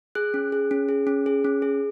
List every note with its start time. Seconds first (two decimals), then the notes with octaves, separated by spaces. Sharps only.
0.15 G#4 F#6
0.34 C#4
0.52 G#4
0.71 C#4
0.89 G#4
1.07 C#4
1.26 G#4
1.45 C#4
1.62 G#4